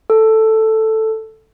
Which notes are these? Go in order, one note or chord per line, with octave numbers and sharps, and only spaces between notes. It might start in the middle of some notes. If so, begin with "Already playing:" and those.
A4